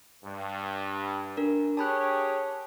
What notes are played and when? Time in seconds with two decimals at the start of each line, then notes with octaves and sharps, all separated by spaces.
0.24 G2
1.37 D4 A#4
1.77 G4 G#4 C#5 A5 B5 F#6